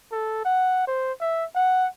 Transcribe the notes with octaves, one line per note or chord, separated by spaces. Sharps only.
A4
F#5
C5
E5
F#5